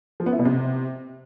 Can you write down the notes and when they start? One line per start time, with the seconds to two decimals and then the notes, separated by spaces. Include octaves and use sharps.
0.20 F3
0.26 B3
0.33 E4
0.39 B2
0.45 C3